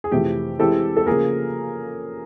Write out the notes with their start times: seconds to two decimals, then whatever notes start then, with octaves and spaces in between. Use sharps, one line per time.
0.04 G#4
0.12 F2 C3 E3 A3 G4
0.59 E3 G#3 C4 E4 G4 A4
0.97 A4
1.06 C#3 F3 A#3 G#4 A#4